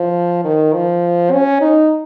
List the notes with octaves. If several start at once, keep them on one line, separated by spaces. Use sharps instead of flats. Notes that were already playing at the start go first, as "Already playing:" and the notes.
Already playing: F3
D#3
F3
C#4
D#4